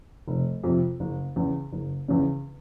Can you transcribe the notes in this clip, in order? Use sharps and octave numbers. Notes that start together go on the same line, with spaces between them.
F1
F2 C3
F#1
E2 C#3
F#1
E2 C#3